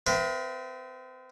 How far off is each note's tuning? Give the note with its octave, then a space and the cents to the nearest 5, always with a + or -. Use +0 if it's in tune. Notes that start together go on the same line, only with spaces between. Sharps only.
C4 -35 A#4 +45 E5 +30